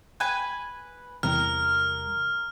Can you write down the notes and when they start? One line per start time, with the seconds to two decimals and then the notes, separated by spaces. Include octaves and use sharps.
0.20 B4 G#5
1.23 E2 C3 G3 A#4 F6